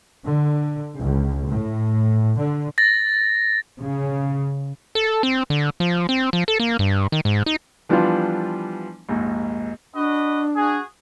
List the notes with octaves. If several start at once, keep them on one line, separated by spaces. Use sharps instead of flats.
D3
C#2
A2
D3
A6 A#6
C#3
A4
C4
D3
F3
C4
F3
A4
A#3
G2
D#3
G#2
D#4
E3 F3 G3 B3 D4 F4
A#1 D#2 G#2
D4 F#4 B4 D#5
F#4 G#4